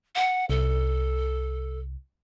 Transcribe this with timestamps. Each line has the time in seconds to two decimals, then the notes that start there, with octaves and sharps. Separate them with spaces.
0.16 F#5
0.50 C2 A4